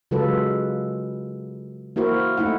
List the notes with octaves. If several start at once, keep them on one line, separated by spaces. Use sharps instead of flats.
C#3 F#3 G#3 F4 A4 B4
A#3 E4 F#4 A#4 C5
A3 D#4 E4 F#5